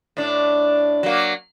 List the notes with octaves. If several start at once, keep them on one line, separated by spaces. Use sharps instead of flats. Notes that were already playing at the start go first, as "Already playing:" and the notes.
A2 D4
F#3 A#3